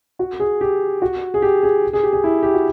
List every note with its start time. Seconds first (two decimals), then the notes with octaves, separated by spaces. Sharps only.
0.19 F#4
0.40 G#4
0.61 G4
1.02 F#4
1.34 G#4
1.42 G4
1.63 G#4
1.93 G#4
2.03 G4
2.13 G#4
2.24 E4
2.43 G4
2.54 F#4